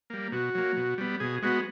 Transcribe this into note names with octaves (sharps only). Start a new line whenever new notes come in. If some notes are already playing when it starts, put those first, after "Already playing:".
G3 A#3
B2 F#4
F#3 A#3
B2
G3 B3
B2 G#4
G#3 B3 F#4